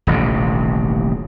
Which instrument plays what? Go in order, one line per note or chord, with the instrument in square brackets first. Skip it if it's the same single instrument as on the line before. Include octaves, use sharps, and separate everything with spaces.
[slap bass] D#1 A1 D#2 C3